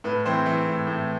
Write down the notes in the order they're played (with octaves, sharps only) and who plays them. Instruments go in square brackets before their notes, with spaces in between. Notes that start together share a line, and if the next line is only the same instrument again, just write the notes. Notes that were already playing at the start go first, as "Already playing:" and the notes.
[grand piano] A2 B4
E3 C4 C5
E3
A2
A2